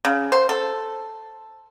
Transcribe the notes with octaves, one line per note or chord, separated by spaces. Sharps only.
C#3
C5
A4